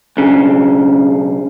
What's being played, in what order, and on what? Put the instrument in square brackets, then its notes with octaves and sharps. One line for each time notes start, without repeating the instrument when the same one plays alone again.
[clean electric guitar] B1 C#3